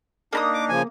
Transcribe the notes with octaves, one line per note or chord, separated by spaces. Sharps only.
A#3 D4 D#4 A#5 D#6
D6
C#3 F3 G#5